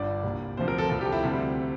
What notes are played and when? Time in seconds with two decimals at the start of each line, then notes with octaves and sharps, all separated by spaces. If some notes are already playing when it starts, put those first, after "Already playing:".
Already playing: G1 G2 D5
0.23 C2 A#2 G3
0.57 D2 C3 F3 C5
0.68 A#4
0.78 A4
0.89 C2 C3 F3 A4
1.01 G4
1.12 E4
1.23 D2 C3 G3